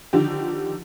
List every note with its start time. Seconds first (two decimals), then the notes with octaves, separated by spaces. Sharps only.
0.13 D3 D#3 F3 G4